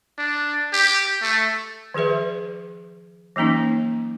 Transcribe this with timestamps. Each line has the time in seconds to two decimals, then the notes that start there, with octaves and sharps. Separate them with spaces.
0.18 D4
0.73 G4
1.22 A3
1.94 D#3 F3 G#4 B4 E5
3.36 E3 F#3 A#3 C#4 D#4